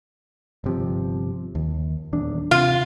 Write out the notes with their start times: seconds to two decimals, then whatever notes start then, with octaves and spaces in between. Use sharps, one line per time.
0.64 G1 C3 F3
1.55 D#2
2.13 D#1 E2 D4
2.51 C3 F4